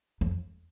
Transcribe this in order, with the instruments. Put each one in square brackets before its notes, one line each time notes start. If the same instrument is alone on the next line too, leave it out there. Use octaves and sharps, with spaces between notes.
[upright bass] F2